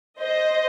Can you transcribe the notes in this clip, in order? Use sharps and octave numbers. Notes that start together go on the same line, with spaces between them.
C5 D#5